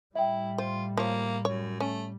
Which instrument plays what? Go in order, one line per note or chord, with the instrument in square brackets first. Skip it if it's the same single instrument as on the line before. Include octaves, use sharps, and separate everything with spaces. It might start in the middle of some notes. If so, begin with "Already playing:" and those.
[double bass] A2 G3 [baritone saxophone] E4 [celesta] E5 G5
[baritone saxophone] F4 [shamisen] C5
[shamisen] F3 C#5 [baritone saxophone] A#3
[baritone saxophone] F#2 [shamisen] C#5
[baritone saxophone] A3 [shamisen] C#4